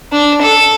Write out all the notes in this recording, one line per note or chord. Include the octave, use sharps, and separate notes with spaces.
D4
A4